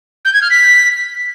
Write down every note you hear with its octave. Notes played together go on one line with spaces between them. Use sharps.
G6
G#6
F6
B6